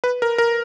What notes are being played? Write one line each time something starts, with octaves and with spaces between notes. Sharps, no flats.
B4
A#4
A#4